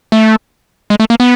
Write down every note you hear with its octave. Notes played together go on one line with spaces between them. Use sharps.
A3
G#3
A3
A#3
B3